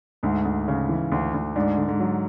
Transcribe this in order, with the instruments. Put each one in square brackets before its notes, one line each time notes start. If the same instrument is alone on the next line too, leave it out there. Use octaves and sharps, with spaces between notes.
[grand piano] D2 [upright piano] G#2
[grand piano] D2
C#3
E3
D2
D2
[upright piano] G#2 [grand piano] D4
[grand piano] D3
[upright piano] G#2
[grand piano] F#3